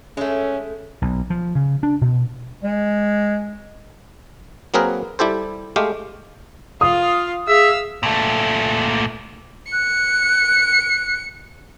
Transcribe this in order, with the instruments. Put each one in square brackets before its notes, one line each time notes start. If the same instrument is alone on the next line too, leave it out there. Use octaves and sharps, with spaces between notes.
[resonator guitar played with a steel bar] G#3 A3 [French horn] C#4
[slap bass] B1
F3
C#3
D4
B2
[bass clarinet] G#3
[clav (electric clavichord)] F#3 A#3 C4 G#4 A#4 B4
G3 E4 G4 A4 C5
G#3 A3 G4 F5
[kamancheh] F4 F5 [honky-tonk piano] D#6
[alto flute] G#4 [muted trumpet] E5 [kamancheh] F5 E6
[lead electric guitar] A#2 A3
[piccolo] F#6 [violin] C#7